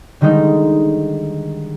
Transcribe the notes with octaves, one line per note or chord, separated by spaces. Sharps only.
D3 D#3 G3 G#3 D#4